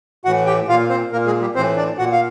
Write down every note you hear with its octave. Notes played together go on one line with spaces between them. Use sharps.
A2 E3 F#4 F#5
G4 G5
A#2 F4 F5
C4 C5
A#2 A#3 A#4
G#3 G#4
G3 G4
A2 E3 C4 C5
D4 D5
A#2 F#4 F#5
F5